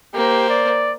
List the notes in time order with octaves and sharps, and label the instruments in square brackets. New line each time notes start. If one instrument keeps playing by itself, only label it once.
[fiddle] A#3 C5 [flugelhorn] G4
[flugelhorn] D5